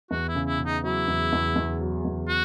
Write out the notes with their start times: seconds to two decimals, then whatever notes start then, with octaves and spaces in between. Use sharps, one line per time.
0.11 E2 F#4
0.29 E4
0.35 C#3
0.47 E4
0.59 C#3
0.66 D#4
0.84 F#3 E4
1.08 E2
1.33 E2
1.56 E2
1.80 F#3
2.05 E2
2.29 F#4